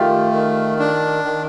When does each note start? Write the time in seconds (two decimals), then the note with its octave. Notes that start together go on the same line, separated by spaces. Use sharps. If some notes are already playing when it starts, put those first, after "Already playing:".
Already playing: D#3 A3 F4 G4
0.33 D#3
0.79 D4
1.25 D#3